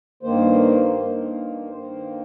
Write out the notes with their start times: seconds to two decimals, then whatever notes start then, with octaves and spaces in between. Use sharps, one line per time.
0.23 G2 D#3 A#3 C5
0.96 G2 D#3 A#3
1.69 G2 D#3 A#3 C5